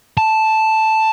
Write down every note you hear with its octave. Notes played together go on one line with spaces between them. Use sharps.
A5